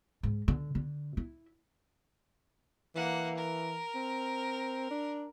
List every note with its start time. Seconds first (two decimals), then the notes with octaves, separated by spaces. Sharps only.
0.23 G#2
0.48 D3
0.75 D3
1.17 E4
2.96 E3 A#3 F#5
3.37 A#4
3.95 C4
4.91 D4